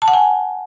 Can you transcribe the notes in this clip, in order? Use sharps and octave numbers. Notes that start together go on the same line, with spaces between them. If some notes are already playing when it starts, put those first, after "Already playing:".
A5
F#5
G#5